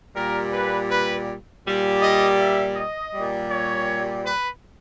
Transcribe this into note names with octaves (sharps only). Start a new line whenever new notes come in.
A#2 G3 A#4
B4
B4
A#2 G3
D#5
E5
D#5
A#2 G3
C#5
B4